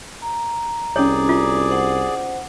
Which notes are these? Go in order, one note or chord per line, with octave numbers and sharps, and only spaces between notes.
A#5
C2 C#4 G#4 C#5 D5
F4
C5 F#5